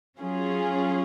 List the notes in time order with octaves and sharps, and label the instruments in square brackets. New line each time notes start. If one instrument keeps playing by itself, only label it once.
[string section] F#3 C#4 F4 G#4